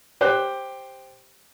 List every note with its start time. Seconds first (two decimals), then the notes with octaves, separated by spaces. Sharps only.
0.21 G4 C5 F#6